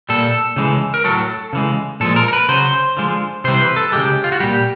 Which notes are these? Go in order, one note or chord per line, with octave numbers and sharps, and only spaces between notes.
A#2 G3 A4
C#3 E3 G#3
A#4
A2 F#3 A4
C#3 E3 G#3
A#2 F3 G#3 A4
A#4
A#4
B4
C#3 F#3 C5
D3 F3 G#3
C3 E3 G3 C5
B4
A4
C#3 E3 G#3 G4
F4
F#4
A#2 G3 G4